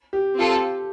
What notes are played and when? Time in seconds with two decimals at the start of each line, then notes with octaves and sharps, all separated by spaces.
0.13 G4
0.36 C4 F4 A4